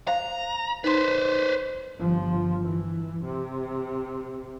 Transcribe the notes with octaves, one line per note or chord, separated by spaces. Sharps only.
C5 F5 A#5
D#4 B4 C5 C6
G1 F3
E3
C3